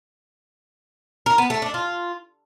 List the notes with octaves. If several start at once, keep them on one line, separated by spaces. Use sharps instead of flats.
A#4
B3
A3
D4
F4